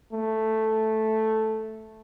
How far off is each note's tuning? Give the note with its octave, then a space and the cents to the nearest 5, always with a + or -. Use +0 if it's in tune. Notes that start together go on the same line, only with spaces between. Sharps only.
A3 +0